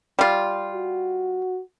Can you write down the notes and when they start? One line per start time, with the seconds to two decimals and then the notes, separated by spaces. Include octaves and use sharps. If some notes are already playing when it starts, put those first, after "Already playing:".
0.19 G3 F4
0.73 F#4